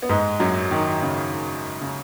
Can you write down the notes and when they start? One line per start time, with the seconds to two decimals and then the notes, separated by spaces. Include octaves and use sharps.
0.02 B3
0.09 G#2 G#3
0.40 F#2 F#3
0.71 D#3
1.02 C#3
1.81 C#3